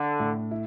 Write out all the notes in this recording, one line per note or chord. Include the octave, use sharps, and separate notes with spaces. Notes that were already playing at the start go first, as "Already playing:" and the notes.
Already playing: D3 D4
A2
E4